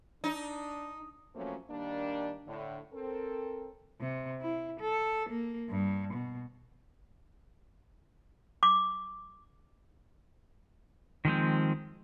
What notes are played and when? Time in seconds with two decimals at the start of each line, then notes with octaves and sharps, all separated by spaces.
0.24 D4 D#4
1.35 F3 F#3 A3 A#3 C4 C#4
1.70 D#3 G3 A#3 D4
2.48 A2 D3
2.93 C4 A4 A#4
4.00 C3
4.41 E4
4.80 A4
5.29 A#3
5.69 G2
6.13 B2
8.63 D6
11.25 D#3 F3 G#3 C4